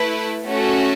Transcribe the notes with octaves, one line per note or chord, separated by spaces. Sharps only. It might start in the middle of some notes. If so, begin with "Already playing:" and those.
Already playing: A3 E4 B4
A3 C#4 F#4